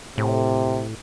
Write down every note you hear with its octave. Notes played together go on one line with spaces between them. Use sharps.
A2 C3